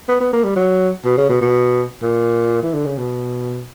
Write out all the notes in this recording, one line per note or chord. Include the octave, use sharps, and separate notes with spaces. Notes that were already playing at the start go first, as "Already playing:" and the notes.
B3
B3
A#3
G3
F#3
B2
C#3
B2
B2
A#2
E3
D3
C#3
B2